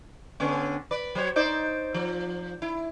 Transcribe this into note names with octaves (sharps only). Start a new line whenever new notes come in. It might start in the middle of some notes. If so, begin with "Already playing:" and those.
D3 B3 C#4
B4 D5
F#3 C5 C#5
D#4 C5 D5
F3
E4